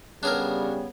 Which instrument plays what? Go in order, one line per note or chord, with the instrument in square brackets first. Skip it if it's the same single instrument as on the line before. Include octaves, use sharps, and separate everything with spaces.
[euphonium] C#3 [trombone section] G3 B3 [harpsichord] D4 G#4 A#4 [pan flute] C#5